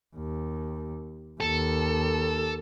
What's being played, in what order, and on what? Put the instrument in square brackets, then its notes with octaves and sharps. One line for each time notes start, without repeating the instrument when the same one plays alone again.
[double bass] D#2
[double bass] D#2 [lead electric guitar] A4